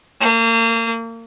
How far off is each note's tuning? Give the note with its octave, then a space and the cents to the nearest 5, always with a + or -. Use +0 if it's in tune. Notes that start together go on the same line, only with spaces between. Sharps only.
A#3 -35